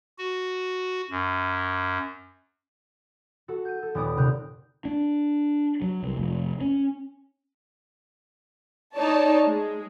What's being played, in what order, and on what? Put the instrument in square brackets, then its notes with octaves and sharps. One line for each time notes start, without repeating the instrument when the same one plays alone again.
[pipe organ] F#4
F#2
[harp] F#4 A4
G6 D#7
A4
D#1 B3 D5 D#6 D7
F#1 C3 A#4 F#6 G6 D#7
[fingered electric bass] D4
F#3
C2
F1
C#4
[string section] D#4 C#5 D5 A5
G#3